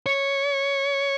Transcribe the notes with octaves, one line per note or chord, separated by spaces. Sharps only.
C#5